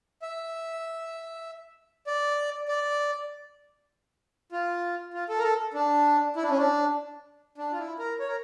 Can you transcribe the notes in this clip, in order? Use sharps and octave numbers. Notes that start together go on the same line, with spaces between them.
E5
D5
D5
F4
F4
A4
A#4
A4
D4
E4
D4
C#4
D4
D4
F4
E4
A#4
C#5
A#4